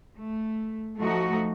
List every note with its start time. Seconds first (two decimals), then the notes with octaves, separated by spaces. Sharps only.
0.18 A3
0.98 F3 A3 D#4 F#4